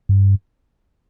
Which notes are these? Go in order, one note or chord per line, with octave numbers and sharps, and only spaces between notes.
G2